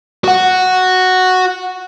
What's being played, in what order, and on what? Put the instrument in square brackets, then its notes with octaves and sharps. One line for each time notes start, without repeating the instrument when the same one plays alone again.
[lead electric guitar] F#4 F#5